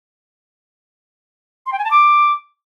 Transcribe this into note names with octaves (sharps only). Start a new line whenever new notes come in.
C6
G5
G#5
A5
D6